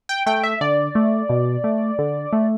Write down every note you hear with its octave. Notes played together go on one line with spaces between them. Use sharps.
G5
A3 G5
E5
D3 D5
A3
B2
A3
D3
A3